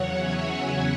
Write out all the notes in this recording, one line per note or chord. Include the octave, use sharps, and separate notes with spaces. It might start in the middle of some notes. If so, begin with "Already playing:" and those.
Already playing: E2 C#3 F#3 C#5 F#5
E5 G#5